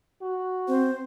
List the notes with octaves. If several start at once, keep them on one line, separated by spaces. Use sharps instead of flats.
F#4
C4 C5